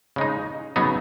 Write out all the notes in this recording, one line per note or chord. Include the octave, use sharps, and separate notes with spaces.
C#3 G#3 D#4
C#3 F#3 B3 D#4